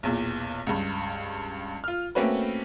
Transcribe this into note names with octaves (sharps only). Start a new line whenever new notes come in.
B1 E2 A#2
C#2 G2
F4 F6
A3 A#3 C4 C#4 F#4 B4